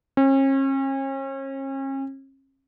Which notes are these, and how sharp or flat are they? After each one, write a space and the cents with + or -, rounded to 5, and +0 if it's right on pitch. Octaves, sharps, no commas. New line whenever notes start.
C#4 -40